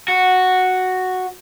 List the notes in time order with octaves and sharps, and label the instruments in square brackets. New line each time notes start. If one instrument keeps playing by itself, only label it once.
[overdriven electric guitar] F#4